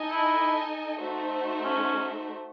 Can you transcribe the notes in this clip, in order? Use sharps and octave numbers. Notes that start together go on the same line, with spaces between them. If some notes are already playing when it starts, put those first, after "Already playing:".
Already playing: D#4 A4 D#5 G#5
E4
A3 D#4 F#4 C5 E5
C#4